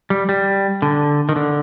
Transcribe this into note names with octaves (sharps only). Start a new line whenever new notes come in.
G3
G3
D3
D#3
D3